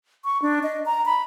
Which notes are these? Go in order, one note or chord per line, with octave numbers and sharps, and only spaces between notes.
C#6
D4
D#5
A#5
B5